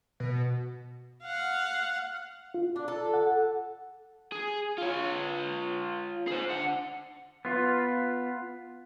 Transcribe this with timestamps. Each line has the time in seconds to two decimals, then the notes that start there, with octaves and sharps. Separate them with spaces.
0.20 B2
1.23 F5 F#5
2.54 F4
2.76 D4
2.88 A4
3.14 F#5
4.32 G#4
4.78 F4 C#5
6.27 G#4 C5
6.50 D3 F#5
7.45 B3 F4